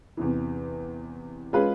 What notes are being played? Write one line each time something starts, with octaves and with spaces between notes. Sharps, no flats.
E2 C3 E3
G#3 C#4 F4 G#4 B4